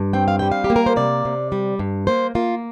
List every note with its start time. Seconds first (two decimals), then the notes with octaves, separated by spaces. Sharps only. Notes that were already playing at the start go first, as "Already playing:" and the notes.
Already playing: G2
0.13 C4 G5
0.28 F5
0.39 G3 G5
0.52 F5
0.64 G4
0.70 A#3
0.76 A#4
0.86 C5
0.96 C3 D5
1.25 C3
1.52 G3
1.79 G2
2.07 A#3 C5
2.35 A#3 F4